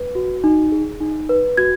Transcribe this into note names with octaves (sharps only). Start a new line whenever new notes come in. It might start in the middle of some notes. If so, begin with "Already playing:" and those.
Already playing: B4
F#4
D#4
G#4
D#4
B4
F#4 G#6